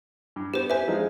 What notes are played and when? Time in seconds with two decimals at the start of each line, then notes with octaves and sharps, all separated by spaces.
0.36 G2
0.54 B3 G4 C5
0.70 B4 C5 E5 G#5
0.88 F3 G#3 D#4